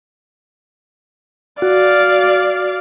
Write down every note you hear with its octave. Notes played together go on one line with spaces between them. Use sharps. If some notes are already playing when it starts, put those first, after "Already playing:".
F#4 D5 F5